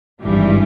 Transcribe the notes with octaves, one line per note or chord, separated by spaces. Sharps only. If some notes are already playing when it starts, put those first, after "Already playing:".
G#1 G2 E3 G3